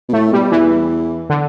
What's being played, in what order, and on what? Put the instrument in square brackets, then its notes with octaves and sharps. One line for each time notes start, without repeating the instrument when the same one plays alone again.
[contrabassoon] B2
[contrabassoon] A2 [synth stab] A3
[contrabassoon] B2 [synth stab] G3
[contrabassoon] E2 [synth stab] E3
[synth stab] D3